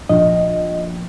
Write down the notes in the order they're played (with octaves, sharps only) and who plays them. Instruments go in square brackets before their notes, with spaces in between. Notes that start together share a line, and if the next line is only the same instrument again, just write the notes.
[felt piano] A#1 [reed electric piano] D#5